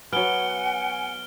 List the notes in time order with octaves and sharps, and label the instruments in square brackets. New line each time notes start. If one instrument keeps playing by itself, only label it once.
[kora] F#3 B3 [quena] F#5 [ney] G#5 [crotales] F6 D7 G7